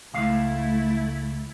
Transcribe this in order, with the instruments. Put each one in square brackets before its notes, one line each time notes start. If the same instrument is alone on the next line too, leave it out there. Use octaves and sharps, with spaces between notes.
[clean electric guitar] C#2 F5 [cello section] A3 E4